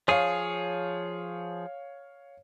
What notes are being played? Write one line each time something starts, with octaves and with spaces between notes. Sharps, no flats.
F3 G#4 C#5 F5